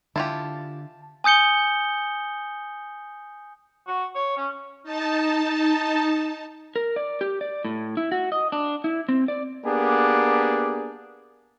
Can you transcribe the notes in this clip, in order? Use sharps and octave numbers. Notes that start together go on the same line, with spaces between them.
D3 E4 F4 G4 A5
G#5 D#6 G6 C#7 G7
F#4
C#5
C#4
D#4 A5
A#4
D5
G4
D5
A2
E4
F#4
D#5
D4
E4
C4
D5
A#3 B3 D4 G4 G#4